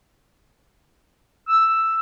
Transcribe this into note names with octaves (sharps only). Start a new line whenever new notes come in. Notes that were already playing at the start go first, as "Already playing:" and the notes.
E6